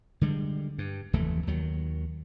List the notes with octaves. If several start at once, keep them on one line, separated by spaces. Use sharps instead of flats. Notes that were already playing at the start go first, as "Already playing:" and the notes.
D3 G3 G#3
G2
F1 D#2 E3 A3
D#2 D#3 F#3